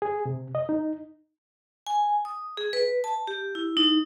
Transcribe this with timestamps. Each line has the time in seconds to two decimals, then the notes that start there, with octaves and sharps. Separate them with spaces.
0.02 G#4
0.25 C3
0.55 D#5
0.69 D#4
1.87 G#5
2.25 D#6
2.57 G#4
2.73 B4
3.04 A5
3.27 G4
3.55 E4
3.77 D#4